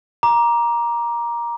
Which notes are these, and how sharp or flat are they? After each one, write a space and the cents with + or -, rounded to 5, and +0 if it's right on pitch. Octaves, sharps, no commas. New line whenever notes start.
A#5 +15 D6 +0